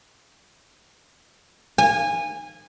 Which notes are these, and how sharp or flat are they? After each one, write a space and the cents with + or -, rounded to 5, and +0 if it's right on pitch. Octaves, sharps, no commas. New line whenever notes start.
G#5 -20